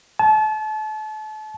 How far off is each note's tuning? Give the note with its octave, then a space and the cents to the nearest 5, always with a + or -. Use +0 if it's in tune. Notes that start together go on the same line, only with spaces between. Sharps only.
A5 -35